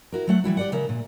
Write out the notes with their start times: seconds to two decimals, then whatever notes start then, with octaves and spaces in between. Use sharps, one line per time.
0.12 E4 F#4 A#4
0.27 F#3 A3 F#5
0.44 E3 G3 E4 F#4
0.57 G4 D5 F#5
0.72 C#3 A#4 E5 F#5
0.89 A#2